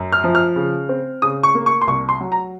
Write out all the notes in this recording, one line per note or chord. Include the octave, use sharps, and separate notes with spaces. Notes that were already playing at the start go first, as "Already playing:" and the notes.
Already playing: F#2
F6
F3
F6
C#3
C4
C#3 D#6
C#6
A#3
C#6
C6
C2 C#6
C6
F#3
A#5